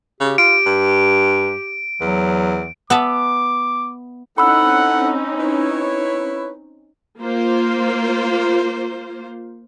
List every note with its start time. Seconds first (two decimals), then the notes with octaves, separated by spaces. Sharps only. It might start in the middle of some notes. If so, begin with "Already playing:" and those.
0.20 C#3 G4
0.38 F4 D7
0.66 G2
2.01 E2 F#3
2.90 B3 E5 A5 D6
4.38 C4 C#4 D#4 E4 A4 F#5 B5 E6
5.40 E4 B4 C#5
7.20 A#3 F4 C5